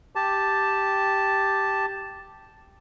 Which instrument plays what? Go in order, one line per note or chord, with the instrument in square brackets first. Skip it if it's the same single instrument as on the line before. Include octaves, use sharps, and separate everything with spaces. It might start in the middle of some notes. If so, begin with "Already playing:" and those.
[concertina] G4 A5